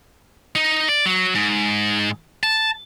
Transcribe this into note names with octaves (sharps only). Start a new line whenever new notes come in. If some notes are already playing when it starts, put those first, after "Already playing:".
D#4
D5
F#3
G#2
A5